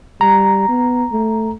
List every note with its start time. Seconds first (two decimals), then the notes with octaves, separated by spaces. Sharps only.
0.21 G3 A#5
0.68 B3
1.12 A3